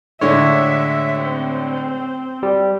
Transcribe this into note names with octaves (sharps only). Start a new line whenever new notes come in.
A2 D3 G#3 C#5 E5
C4
G3